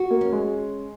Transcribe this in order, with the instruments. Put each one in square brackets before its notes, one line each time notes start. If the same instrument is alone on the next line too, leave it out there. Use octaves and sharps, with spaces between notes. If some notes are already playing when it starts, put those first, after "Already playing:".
Already playing: [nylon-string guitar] F#4
[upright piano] A#3
[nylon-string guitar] C#4
[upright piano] G#3